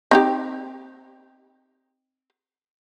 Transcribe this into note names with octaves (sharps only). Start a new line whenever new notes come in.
C4 D#4 G4